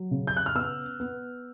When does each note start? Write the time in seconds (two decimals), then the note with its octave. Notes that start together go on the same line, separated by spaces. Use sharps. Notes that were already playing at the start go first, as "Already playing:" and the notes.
Already playing: F#3
0.11 C#3
0.27 G6
0.37 F#6
0.46 F6
0.55 B3 E6
1.00 B3